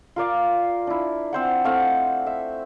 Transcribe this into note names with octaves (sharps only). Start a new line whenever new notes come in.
F4 A#4 D5 F5
D4 E4
C4 C5 F#5
A3 C4 F5 F#5
E5